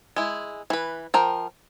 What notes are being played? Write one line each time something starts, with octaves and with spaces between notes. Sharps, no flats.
G#3 E4
E3 B4
F3 A#4 G5